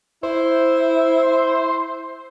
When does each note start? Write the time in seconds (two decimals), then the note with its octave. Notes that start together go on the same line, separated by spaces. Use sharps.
0.23 E4 C5